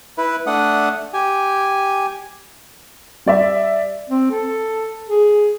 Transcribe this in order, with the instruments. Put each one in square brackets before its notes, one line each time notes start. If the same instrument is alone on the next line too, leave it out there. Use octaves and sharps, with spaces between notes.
[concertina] E4 B4
A3 D4 F#5 D#6
G4 G#5
[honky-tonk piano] G3 D5 E5
[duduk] C4
A4
G#4